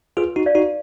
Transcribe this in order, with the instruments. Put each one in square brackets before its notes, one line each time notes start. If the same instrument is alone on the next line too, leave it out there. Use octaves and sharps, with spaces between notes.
[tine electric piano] F4 G#4 [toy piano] B4
[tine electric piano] D#4 F#4
[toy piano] D5 F5
[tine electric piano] D#4 F#4